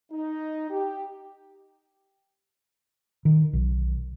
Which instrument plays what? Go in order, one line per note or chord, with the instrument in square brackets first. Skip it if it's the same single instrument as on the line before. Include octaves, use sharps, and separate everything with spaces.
[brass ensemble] D#4
G4
[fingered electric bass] D#3
B1